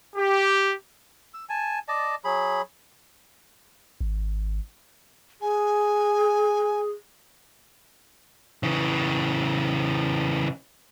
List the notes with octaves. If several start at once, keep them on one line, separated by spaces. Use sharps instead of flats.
G4
E6
G#5 A5
D5 D#5 A5
F#3 G#4 B5
G#1
G#4 G#5
C#3 E3